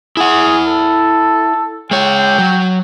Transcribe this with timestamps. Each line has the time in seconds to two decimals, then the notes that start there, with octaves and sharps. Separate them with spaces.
0.17 E4 G#4 F#5
0.66 A4
1.91 G#3 C#5 G5
2.38 F#3